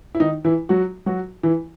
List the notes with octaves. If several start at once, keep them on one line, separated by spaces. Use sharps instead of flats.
E4
D#3 D#4
E3 E4
F#3 F#4
F#3 F#4
E3 E4